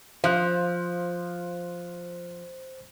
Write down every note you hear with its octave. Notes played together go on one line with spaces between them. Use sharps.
F3 C5 F5 F#6